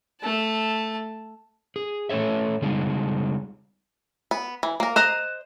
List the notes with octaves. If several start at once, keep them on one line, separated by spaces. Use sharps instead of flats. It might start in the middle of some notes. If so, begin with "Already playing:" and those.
A3 A5
G#4
A3 C#4 A4 C#5 E5
C#3 G3 G#3 D#4
B3
E3
A#3 A#4
C5 D#5 A#5 F#6 E7